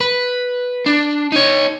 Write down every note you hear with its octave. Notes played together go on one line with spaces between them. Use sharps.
B4
D4
D#4 C#5